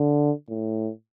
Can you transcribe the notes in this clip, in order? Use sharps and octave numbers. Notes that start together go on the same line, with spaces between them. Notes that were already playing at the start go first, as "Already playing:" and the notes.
Already playing: D3
A2